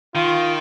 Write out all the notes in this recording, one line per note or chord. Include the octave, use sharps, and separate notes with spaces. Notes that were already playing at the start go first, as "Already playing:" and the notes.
D#3 F4